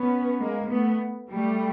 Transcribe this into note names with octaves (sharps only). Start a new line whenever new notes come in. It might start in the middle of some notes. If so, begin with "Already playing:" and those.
Already playing: B3 C#4
G#3 A#3
A3 B3
G3 A3